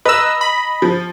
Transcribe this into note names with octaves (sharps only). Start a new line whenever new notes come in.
B4 D#5 A#5 E6
B5
F3